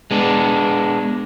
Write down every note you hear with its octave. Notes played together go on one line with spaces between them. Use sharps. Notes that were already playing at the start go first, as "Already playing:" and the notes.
G#3 B3 D4